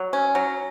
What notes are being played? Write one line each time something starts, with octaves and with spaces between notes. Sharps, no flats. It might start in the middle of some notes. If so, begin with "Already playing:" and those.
Already playing: F#3
C#4
F#3